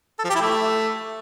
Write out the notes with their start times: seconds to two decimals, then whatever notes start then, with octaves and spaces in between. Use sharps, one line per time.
0.19 A4
0.24 F3
0.30 G4
0.35 E4
0.41 A3